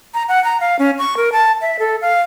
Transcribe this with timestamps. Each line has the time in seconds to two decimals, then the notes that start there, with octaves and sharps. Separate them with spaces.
0.14 A#5
0.29 F#5
0.44 A#5
0.61 F5
0.79 C#4
0.98 C#6
1.17 A#4
1.32 A5
1.61 E5
1.79 A4
2.02 F5